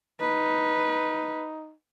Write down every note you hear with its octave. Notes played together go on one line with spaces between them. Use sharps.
D#4 B4